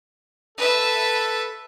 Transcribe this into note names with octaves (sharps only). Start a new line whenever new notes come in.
A4 B4 E5